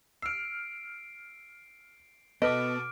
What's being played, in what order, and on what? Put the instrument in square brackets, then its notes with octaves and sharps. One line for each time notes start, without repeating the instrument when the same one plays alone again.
[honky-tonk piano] E6 F6 [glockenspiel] C7 D7
[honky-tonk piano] B2 A4 [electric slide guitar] B3 [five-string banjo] B4 D#5 [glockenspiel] D6 F6 D7